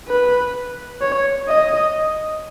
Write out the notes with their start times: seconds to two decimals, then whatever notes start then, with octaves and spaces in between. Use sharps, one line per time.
0.08 B4
1.01 C#5
1.48 D#5